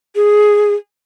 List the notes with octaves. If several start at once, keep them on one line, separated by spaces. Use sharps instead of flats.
G#4